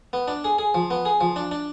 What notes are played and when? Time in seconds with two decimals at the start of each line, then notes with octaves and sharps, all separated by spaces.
0.13 B3
0.28 D4
0.44 G#4
0.59 G#4
0.74 F3
0.90 B3
1.05 G#4
1.21 F3
1.36 D4
1.51 D4